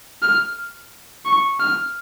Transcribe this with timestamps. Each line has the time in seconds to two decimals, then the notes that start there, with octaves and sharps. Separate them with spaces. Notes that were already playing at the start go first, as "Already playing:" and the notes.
0.22 F6
1.25 C#6
1.60 F6